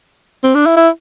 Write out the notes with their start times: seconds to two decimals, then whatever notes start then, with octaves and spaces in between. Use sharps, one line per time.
0.44 C4
0.55 D4
0.66 E4
0.77 E4